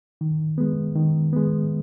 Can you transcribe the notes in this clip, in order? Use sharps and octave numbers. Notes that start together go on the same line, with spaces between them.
D#3
G#3 B3
D#3
G#3 B3